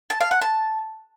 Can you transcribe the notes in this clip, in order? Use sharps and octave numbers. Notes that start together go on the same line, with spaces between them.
A5
F5
F#5
A5